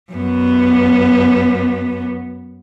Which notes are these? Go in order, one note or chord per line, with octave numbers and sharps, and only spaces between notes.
F#2 B3